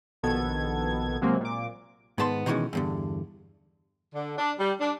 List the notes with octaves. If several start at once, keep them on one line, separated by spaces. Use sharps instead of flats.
A#1 B2 D#3 B3 A4 G#6
C3 F#3 G#3 A#3 C4
A#2 D6
G#2 D#3 B3 A5 C6
B2 D#3 E3 F#3 G#3 C#4
E2 G2 D3
D3
D4
G3
D4